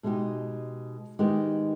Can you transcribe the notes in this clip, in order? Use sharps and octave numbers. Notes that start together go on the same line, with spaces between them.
B2 G#3 D#4 G4
D#3 G#3 B3 D#4 G4